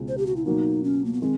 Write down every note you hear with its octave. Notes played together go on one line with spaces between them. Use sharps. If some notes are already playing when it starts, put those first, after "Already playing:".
Already playing: C#2 B2 G#3 C4
C5
G4
F#4
E4
B2 F#3 A#3 D#4
C#4
A#3
B3
D#3 G#3 C4